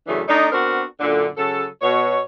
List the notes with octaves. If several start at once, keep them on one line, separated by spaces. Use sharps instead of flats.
F#2 C#3 E3 A3 D4
A3 D4 D#4
B3 C4 D4 F#4 A#4
F#2 A#2 D3
C#3 F#3 A4
B2 C#5